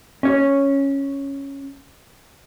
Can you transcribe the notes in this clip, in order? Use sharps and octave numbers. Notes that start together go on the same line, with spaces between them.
C#4 C#5